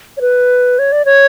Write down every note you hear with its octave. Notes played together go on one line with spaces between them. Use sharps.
C#5
B4
C#5
D5
C#5